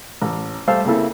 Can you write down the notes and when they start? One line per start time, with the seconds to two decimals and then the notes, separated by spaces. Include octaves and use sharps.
0.22 A1
0.68 G3 A3 C5 F5 E6
0.85 C#3 A#3 C4 E4 A4